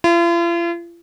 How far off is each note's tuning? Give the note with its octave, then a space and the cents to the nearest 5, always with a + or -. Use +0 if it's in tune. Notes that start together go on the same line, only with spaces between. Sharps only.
F4 -45